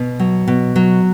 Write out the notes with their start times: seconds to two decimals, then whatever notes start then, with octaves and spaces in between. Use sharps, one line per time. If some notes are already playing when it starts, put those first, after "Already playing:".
Already playing: B2
0.19 F#3
0.48 B2
0.76 F#3